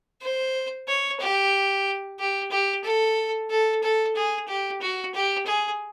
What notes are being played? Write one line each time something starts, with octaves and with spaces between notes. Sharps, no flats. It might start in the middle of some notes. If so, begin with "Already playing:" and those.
C5
C#5
G4
G4
G4
A4
A4
A4
G#4
G4
F#4
G4
G#4